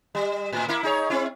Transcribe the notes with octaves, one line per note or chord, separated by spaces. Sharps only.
G3
A2
A#3 E4
D#4 G#4 C#5
C4 E4